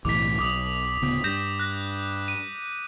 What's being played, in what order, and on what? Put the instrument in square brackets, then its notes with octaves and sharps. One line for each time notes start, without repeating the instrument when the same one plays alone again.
[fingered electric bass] B1 A2 E3 [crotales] D6 B6
[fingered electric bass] B1 [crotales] D6 D#6
[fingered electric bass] D1 C#3 B3
[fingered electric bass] G2 [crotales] G6 A#6 E7
[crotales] F#6 A#6
D#7